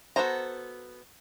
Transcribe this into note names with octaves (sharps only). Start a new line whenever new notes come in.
B3 F#4 A4 C5 A#5